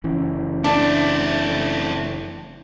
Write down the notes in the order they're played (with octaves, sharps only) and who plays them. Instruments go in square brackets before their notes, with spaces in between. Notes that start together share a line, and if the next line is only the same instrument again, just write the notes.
[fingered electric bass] F#1 E3 C#4
[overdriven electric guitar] A3 C4 [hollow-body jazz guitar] D4